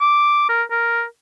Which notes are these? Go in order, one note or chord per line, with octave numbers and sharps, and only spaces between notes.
D6
A#4
A#4